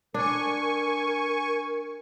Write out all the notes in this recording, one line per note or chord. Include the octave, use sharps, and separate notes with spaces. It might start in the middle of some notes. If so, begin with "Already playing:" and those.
D4 A#4 G#5 C#6